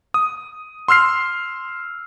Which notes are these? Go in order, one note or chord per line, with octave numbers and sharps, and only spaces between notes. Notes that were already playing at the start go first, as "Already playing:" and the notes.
D#6
C6 E6 F6 C7